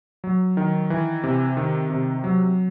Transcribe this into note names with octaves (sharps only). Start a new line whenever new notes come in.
F#3
D#3
E3
C3
D#3
C3
F#3